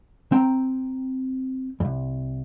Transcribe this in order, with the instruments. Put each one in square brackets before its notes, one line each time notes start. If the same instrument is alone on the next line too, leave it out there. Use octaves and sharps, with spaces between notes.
[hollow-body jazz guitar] C4 G5 A#5
C2 F2